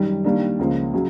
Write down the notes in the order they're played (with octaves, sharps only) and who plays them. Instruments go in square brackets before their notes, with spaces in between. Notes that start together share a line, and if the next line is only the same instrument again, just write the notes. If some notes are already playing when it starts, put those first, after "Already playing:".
Already playing: [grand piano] F#2 D#3 G3
D#3 G3 A#3 D4
C#2 C#3 F3 A#3
C#3 F#3